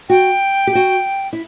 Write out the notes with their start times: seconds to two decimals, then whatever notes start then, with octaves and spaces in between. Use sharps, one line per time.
0.09 F#4 G5
0.67 G4
0.75 F#4
1.33 E4